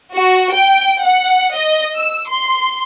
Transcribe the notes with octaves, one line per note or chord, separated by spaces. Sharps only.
F#4
G5
F#5
D#5
E6
C6